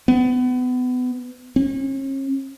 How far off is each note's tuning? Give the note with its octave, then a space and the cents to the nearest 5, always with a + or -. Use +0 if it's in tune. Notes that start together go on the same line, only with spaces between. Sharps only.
B3 +25
C#4 -40